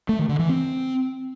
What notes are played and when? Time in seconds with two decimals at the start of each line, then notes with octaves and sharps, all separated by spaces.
0.09 A3
0.19 D#3
0.29 D3
0.39 E3
0.49 C4